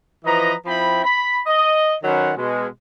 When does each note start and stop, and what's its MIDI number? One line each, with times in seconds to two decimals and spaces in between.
0.25 0.53 52
0.25 0.53 53
0.25 0.53 71
0.25 0.53 75
0.25 0.53 82
0.66 0.99 53
0.66 0.99 60
0.66 0.99 64
0.66 0.99 79
0.66 0.99 83
1.04 1.39 83
1.47 1.95 75
2.03 2.32 51
2.03 2.32 54
2.03 2.32 61
2.03 2.32 71
2.03 2.32 72
2.03 2.32 78
2.37 2.67 47
2.37 2.67 56